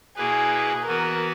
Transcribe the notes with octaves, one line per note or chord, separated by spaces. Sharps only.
B2 A#3 E4 G#4 B4
E3 B3 F#4 A#4 B4